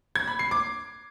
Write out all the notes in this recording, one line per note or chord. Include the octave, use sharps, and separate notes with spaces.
G#6
B5
C7
D6